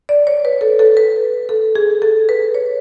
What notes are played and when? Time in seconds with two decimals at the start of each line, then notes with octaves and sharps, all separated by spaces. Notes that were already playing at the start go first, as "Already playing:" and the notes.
0.09 D5
0.27 C#5
0.45 B4
0.61 A4
0.79 A4
0.97 B4
1.49 A4
1.76 G#4
2.02 A4
2.29 B4
2.55 C#5